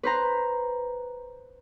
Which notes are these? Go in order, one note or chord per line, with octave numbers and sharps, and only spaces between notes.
B4 C5 A#5